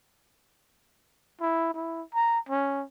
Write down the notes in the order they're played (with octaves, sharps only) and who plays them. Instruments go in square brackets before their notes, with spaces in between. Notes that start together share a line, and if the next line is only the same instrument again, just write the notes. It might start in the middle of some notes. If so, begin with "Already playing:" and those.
[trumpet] E4
E4
A#5
C#4